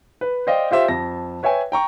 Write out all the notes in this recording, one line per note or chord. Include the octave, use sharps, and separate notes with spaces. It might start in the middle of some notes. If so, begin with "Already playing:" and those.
B4
C5 D5 D#5 F5 G5
F4 G4 C5 E5
F2 A5 A#6
B4 C#5 E5 G5 G#5
G5 A#5 C#6